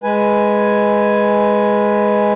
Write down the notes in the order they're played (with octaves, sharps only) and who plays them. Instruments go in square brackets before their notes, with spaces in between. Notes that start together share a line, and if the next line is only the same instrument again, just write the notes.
[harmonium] G#3 B4 G#5